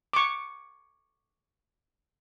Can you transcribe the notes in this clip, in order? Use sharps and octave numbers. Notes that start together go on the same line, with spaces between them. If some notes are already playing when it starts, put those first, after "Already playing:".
C#6 D6